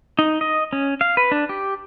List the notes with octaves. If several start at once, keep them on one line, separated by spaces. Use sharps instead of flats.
D#4
D#5
C#4
F5
B4
D4
G4